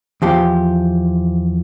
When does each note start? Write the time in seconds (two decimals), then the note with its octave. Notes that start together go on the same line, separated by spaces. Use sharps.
0.22 E2 F3 G4